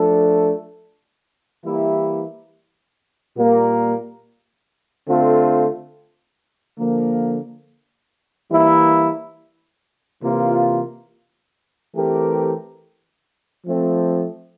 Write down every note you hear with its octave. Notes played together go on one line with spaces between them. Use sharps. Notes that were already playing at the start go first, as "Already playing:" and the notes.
Already playing: F3 A3 D4 A4
E3 G3 A#3 E4 G4
A#2 G3 A#3
D3 A3 C4 F4 A4
D3 F3 A#3
E3 G3 A#3 E4
C3 E3 A#3 F4
E3 A3 C4 G4 A#4
F3 A3 C4